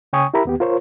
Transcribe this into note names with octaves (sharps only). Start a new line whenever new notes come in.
C#3 C#5 G5 G#5 C#6 D#6
E4 G4 A#4 E5 A#5 B5
D#2 B3 G4
F4 A#4 C5 C#5